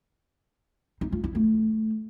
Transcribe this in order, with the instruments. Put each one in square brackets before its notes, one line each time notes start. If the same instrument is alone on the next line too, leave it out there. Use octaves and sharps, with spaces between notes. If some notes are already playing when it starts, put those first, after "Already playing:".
[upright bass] D#4
F4
E4
A3